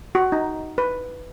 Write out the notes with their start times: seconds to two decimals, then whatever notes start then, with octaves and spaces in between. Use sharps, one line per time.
0.15 F#4
0.32 D#4
0.78 B4